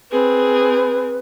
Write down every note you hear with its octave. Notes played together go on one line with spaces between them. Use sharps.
C4 G#4 B4